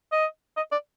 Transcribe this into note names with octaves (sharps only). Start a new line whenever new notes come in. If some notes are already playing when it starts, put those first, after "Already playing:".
D#5
D#5
D5